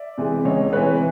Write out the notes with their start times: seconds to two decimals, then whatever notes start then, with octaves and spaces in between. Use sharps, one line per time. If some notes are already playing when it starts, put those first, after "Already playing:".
Already playing: D5 E5
0.18 C3 E3 G#3
0.45 C#2 C#5 D#5
0.73 C3 E3 G#3 B4 C#5